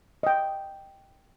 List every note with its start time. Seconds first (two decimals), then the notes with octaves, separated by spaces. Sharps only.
0.23 D#5 G5